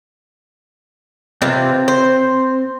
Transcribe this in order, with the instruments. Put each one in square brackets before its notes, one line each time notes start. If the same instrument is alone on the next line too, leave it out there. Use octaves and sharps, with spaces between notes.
[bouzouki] C3 E3 F4 [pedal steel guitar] C4
[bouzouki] C5